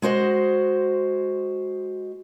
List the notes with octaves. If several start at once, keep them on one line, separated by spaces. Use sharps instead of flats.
G#3 F#4 C5 D#5